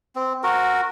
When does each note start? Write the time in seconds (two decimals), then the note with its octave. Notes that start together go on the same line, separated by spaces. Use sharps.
0.16 C4
0.43 F#4 A#4